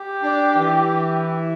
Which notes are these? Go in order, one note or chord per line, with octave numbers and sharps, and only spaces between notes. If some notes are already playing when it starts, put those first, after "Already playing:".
Already playing: G4
D4
E3
E4